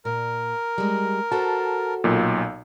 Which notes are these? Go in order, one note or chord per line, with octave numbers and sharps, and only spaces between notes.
A#2 A#4
G3 G#3
F#4 A4 C5 A5
B1 A#2